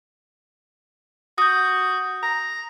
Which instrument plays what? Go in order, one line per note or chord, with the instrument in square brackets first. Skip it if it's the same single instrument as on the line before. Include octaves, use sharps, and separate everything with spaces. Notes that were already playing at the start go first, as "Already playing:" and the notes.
[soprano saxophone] F#4 [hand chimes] D#6 G6
[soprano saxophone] A#5